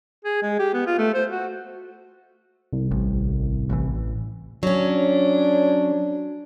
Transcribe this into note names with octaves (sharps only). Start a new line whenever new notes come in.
G#4
G#3
G4
B3
F4
A3
C5
F#4
C2
A1
A1 A2 E3
F#3 C#4 D4